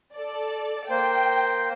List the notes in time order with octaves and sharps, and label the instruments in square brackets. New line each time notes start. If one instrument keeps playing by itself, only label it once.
[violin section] A4 D5
[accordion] A#3 C5 [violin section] G5